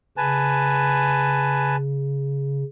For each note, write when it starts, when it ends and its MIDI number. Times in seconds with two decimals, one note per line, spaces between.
0.17 2.64 49
0.17 1.76 71
0.17 1.76 80
0.17 1.76 81